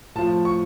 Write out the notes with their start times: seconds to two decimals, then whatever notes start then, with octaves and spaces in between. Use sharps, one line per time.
0.16 A2 F3 A5
0.45 C#6